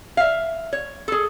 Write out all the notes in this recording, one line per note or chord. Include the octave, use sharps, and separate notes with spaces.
E5 F5
C#5
G#4 A4